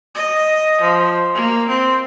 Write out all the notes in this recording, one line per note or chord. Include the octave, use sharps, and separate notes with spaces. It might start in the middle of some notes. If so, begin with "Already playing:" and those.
D#5
F3
A#3
C4